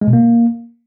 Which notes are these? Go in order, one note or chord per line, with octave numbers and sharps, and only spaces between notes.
G#3
B2
A#3